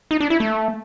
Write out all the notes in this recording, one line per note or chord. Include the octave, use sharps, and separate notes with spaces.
D#4
D4
E4
A3